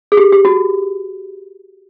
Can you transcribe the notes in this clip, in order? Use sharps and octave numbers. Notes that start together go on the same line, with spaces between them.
G#4
G4
G4
F#4